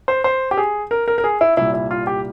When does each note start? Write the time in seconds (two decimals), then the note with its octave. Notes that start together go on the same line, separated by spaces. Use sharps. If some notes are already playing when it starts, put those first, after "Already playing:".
0.08 C5
0.24 C5
0.51 G4
0.57 G#4
0.91 A#4
1.08 A#4
1.18 A#4
1.24 G#4
1.41 E4
1.57 C2 A#2 G3 E4
1.74 E4
1.91 F4
2.07 G4